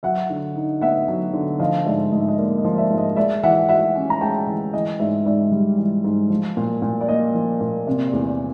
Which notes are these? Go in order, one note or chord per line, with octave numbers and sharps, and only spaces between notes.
F#3 E5 F#5
D3
D#4
B3 E5 F#5
F#3
D3
F3 D#5 F5
G#2 D5 E5
G#2 D#5
E5
D#5
A#3 D5
D#5
F3
D5 E5
G#2
D#5
G#3 D5 E5
E3 E5 F#5
F#4 E5 F#5
C#4
A#5
G#3 G5 A5
E3
E3 D#5
G#2 D5 E5
G#2 D5 E5
G3
E3
G#2
F3
A#2
A#2
D5
A#3 D#5
F3
A#2
C3 D5
D5
E2
D5